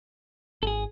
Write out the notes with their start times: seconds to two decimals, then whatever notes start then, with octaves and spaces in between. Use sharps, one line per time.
0.63 G#1 G#4 A4